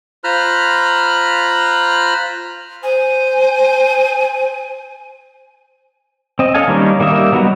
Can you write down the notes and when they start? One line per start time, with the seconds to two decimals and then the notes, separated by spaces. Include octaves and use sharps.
0.24 F4 C5 A#5 B5 F6 F#6
2.83 C5 G#5
6.39 C4 D#5
6.54 C#4 A4 D#5 F5 G#5
6.68 D#3 G3 A#3 C#4 D#4
7.00 G3 A#3 D#4 E5 D#6
7.32 F#3 G3 B3 D#4 F#4